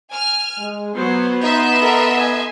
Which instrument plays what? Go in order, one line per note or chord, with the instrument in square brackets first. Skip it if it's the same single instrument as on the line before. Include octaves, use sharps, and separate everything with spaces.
[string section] G#5 F6
[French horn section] G#3
[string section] F#3 [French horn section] B3 [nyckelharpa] C5
[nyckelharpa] D#4 [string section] D#5 E5 C6
[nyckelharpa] A4 A#4
G#5